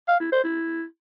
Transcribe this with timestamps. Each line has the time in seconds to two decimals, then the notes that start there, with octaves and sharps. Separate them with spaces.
0.08 F5
0.20 E4
0.32 C5
0.44 E4